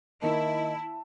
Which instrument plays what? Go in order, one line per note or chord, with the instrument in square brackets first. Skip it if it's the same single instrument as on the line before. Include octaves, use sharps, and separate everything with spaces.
[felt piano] D#3 A#3 [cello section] E4 [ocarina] D#5 [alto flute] A5